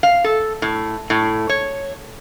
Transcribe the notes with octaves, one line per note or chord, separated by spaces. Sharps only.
F5
A4
A2
A2
C#5